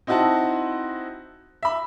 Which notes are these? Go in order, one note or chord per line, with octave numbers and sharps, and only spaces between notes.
C4 D#4 E4 F#4 A5
E5 B5